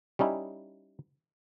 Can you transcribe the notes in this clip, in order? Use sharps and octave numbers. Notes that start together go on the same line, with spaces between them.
G3 C#4 D#4 E4